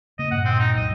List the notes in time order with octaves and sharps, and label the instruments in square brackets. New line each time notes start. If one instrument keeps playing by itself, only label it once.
[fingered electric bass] C#3 A#3 [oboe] D#5
[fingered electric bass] G2 A#2 [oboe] F#5
[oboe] C4
D#4
[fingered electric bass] C2 G2 F#3 [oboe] D#5